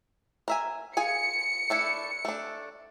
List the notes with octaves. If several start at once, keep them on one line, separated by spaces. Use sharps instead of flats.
A#4 E5 G#5
F4 G#4 G#5 C#7
A3 D4 E4
A3 D4